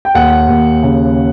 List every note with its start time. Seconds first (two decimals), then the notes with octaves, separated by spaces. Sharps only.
0.05 G5
0.15 D#2 F#5
0.49 D#2
0.83 C#3